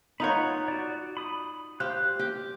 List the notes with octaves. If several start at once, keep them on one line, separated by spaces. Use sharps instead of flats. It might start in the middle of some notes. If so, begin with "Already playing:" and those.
D#4 F4 C#5 F#5 A#5 B5
F#4 D5
B5 D#6
G4 C5 F5 F#6
G4